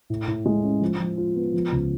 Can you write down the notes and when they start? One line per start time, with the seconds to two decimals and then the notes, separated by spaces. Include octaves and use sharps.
0.10 A2
0.28 A2
0.46 G#3
0.63 C#4
0.81 F3
1.00 F3
1.17 F4
1.36 B3
1.54 F3
1.72 C#2